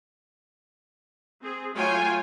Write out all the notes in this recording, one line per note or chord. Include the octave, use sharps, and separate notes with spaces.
C4 G#4
F#3 A3 F4 C#5 G5 G#5